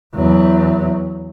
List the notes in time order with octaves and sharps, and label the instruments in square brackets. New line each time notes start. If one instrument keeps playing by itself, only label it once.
[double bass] E2 F#3